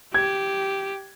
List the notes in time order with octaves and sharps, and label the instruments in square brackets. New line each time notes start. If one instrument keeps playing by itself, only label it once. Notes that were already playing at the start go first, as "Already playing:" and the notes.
[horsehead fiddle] G4 [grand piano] G#6